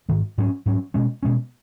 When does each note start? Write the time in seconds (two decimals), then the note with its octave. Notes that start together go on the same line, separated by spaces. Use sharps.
0.09 G#2 D#3 G#3
0.38 G#2 F#3 C#4
0.66 G#2 F#3 C#4
0.94 B2 G#3 C#4
1.23 B2 G#3 C#4